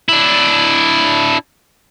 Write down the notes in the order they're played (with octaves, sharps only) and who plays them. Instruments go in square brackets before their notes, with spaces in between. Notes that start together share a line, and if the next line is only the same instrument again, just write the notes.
[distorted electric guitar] D4 E4